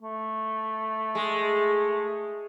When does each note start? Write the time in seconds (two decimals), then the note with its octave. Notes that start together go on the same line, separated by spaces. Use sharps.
0.01 A3
1.15 G#3